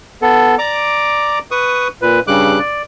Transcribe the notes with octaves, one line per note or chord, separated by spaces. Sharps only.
B3 A4
D5 A#5 D6
B4 C#6 D#6
A#2 B4
G2 C#3 G3 D6 F#6
D5